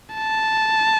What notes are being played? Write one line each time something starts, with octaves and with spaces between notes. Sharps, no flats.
A5